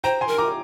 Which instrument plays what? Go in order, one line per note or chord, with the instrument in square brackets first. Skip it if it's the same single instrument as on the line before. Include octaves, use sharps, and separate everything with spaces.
[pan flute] C5 [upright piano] G5 A#5
[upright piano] G#5 C6
[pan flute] A#4
[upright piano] A#5 D6